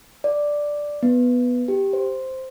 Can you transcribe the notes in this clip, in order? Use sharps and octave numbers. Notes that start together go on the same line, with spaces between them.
D5
B3
G4
C5